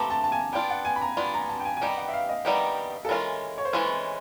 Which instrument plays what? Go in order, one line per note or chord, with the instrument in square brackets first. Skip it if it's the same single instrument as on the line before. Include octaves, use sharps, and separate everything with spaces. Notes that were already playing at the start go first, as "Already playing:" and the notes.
Already playing: [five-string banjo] A3 C4 G4 B4 [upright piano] A#5 D6
[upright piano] A5
A5
G#5
[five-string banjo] B3 D4 F4 [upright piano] G5
[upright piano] F#5
G#5
B5
A#5
[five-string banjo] B3 D4 F4 [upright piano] B5
[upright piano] A#5
A5
G5
G#5
G#5
[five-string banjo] D#3 G3 B3 D#4 G4 [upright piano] G5
[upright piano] F#5
E5
F5
D#5
[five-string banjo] D#3 G3 B3 D#4 G4
[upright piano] A4
[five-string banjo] E3 G#3 C#4 F4 [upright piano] A#4
[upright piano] C#5
C5
[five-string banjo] E3 G#3 C#4 F4 [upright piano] B4